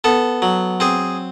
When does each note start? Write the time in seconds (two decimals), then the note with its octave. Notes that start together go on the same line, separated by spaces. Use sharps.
0.04 B3 A4
0.42 F#3
0.80 C4 G#4